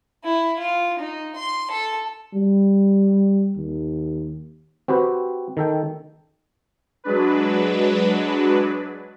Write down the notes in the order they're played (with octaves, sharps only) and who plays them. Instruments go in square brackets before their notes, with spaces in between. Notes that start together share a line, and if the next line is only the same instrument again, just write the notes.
[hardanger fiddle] E4
F4
D#4
C6
A4
[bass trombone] G3
D#2
[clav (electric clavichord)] C4 F#4 G4 B4
D#3 A4 G5
[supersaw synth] F#3 G#3 D4 B4